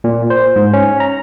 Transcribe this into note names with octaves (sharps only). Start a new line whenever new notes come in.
A#2
C5
G#2
C#4
A#5